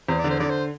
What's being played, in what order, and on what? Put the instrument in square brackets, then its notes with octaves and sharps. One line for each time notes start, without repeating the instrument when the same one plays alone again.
[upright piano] E2 [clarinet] C5
[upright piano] D3 [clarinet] D5
[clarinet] C5
[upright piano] D3 [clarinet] D5
[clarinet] C5